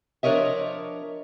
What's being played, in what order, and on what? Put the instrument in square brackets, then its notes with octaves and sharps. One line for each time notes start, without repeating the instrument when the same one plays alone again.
[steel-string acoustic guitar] F3 D4 A#4 C#5 D#5 E5